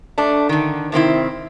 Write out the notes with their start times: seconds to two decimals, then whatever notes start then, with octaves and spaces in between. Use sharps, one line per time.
0.18 A3 D4
0.49 D3 D#3
0.92 C3 D#3 C4 E4